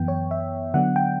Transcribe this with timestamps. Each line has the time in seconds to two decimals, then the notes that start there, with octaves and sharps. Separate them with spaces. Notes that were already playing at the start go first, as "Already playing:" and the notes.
Already playing: F#2 E3 B3 G5
0.08 C#5
0.31 E5
0.74 D3 F#3 B3 D4 F#5
0.96 G5